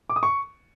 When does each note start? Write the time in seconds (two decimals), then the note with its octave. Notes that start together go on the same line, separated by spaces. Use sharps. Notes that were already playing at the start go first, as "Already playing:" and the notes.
0.10 D6
0.16 D#6
0.23 C#6